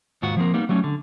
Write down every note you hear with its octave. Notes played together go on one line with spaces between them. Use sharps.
D#2 G#2 F4 F#4 F#5
F3 A#3 C4 A#4
G3 A#3 B3 D#4
F#3 G3 A3 C#4
D3